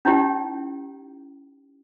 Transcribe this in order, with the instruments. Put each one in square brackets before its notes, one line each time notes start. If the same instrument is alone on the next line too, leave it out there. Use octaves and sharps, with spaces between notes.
[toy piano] C#4 D#4 E4 G4 D5 G5